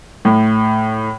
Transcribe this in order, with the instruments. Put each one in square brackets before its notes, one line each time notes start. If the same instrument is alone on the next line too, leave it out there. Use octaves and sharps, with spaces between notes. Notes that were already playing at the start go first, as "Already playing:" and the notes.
[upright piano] A2